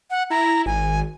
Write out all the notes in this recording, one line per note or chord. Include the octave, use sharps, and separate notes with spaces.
F#5
E4 A#5
G#1 G#5